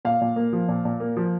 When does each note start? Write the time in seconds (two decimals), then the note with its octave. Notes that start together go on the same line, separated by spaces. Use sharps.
0.05 A#2 F5
0.21 A#2
0.36 A#3
0.53 F3
0.68 A#2
0.85 A#2
1.00 A#3
1.16 F3